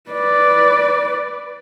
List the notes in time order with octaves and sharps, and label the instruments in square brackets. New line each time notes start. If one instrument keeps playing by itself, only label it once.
[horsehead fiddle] B4 D5